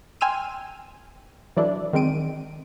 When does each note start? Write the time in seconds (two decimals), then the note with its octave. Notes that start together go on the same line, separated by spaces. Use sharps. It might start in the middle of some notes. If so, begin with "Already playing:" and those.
0.21 G5 G#5 C6 E6 F6 D#7
1.57 E3 F#3 D4 E4 A4 D5
1.93 D#3 G#3 C4 D7 D#7